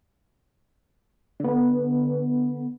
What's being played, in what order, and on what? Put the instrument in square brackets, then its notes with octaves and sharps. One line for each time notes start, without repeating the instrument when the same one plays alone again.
[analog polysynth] D3 B3